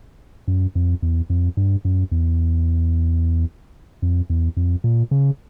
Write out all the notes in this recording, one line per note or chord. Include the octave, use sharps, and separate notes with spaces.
F#2
F2
E2
F2
G2
F#2
E2
F2
E2
F2
A#2
C#3